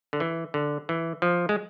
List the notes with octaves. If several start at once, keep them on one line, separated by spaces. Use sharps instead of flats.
D3
E3
D3
E3
F3
G#3